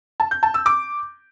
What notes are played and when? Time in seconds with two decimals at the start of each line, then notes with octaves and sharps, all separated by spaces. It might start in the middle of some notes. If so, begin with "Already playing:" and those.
0.20 A5
0.31 G6
0.43 A5
0.54 E6
0.66 D6